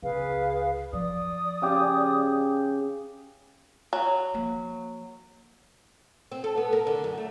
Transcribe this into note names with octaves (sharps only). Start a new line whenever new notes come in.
C#2 G#4 B4 F5
F3 D5 D#6
C#3 G4
F#3
F3 A#3
C4
A4
B3
A#4
D3
F#2
A3